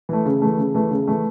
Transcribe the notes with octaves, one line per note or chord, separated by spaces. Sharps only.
E3 A3
C#3
E3 A3
C#3
E3 A3
C#3
E3 A3